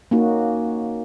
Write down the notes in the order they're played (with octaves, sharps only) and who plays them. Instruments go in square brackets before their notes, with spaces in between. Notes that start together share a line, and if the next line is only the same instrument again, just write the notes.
[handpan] A#3 C#4 D#4 F#4